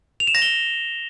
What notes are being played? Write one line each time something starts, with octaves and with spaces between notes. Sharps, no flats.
F7
E7
A#6
G7